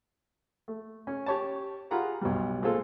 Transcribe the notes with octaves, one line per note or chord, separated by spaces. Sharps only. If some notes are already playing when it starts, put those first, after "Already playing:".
A3
C#4
G4 C#5 A5
F4 G4 G#4 F#5 A#5 B5
B1 B2 G3
A#2 G#3 C4 F4 A4